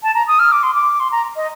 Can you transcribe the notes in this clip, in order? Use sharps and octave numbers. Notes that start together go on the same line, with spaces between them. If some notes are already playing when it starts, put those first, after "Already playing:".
A5
A#5
D#6
F6
D6
C6
D6
C6
A#5
D#5